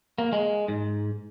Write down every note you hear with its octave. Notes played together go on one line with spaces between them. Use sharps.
A#3
G#3
G#2